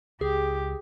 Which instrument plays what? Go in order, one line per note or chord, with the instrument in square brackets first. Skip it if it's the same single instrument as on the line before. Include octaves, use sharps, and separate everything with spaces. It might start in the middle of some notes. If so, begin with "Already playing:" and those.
[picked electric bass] C#2 [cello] G4 [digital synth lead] G#4